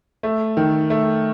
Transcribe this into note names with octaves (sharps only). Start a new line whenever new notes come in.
A3
D#3
A3